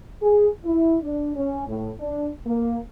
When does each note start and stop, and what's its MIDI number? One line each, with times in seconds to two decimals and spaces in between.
0.22 0.48 68
0.64 0.97 64
1.02 1.30 62
1.35 1.65 61
1.68 1.91 45
1.99 2.28 62
2.46 2.78 58